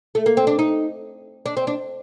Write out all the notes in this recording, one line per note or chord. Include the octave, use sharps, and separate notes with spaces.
A3
A#3
C4
D4
D#4
D4
C4
D4